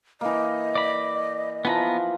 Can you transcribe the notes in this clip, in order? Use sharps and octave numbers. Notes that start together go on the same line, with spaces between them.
E3 A#3 D#5
D5 B5
E3 F3 B3 B4 A#5